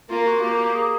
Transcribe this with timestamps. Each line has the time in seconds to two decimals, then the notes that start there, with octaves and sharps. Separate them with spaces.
0.10 A#3 F4
0.26 F#4
0.41 A#3 G4
0.58 G4
0.74 G#4